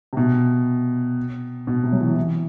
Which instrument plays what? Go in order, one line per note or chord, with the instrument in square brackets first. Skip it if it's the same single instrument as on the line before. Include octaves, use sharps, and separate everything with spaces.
[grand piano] C3
B2
B2
C3
F#3
E3
E3